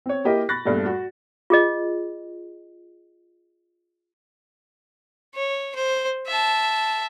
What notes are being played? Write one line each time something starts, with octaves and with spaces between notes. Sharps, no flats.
C4 C#5
A#3 E4 G4 A#4 D#5
B5 C#6 F#6 A6 A#6
E2 G2 A#2 A3
F#4
F4 G#4 D#5
C#5
C5
E5 A5